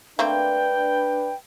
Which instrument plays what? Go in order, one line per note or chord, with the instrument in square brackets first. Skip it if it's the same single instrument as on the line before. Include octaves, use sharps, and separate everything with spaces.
[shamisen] A3 A#3 C4 [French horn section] D4 B4 [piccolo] G5